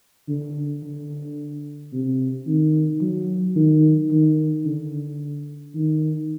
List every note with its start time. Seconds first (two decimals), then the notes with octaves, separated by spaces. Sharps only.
0.29 D3
0.83 D3
1.93 C3
2.47 D#3
3.01 F#3
3.56 D#3
4.10 D#3
4.65 D3
5.75 D#3